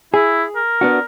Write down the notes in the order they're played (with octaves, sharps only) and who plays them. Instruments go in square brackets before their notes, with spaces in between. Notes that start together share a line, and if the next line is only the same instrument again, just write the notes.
[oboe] E4 [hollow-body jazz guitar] G#4
[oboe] A#4
[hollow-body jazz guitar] B3 D4 F#4